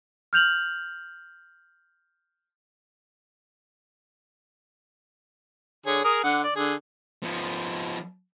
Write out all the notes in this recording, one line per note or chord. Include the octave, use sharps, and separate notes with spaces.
F6 G6 F7 F#7
D3 G#4 C#5
G#4 A#4 D#6
D3 F#5
D5
D3 G#4
F3 B3